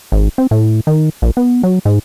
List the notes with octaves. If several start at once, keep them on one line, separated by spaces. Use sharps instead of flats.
G#1
C4
A2
D#3
A#1
B3
F#3
G#2